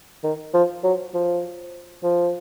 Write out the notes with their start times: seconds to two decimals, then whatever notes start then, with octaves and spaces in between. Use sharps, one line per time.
0.24 D#3
0.54 F3
0.84 F#3
1.14 F3
2.03 F3